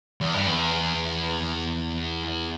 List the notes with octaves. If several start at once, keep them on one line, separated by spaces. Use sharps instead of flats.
E2
G2
E2